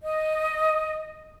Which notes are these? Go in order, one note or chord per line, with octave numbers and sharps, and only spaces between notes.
D#5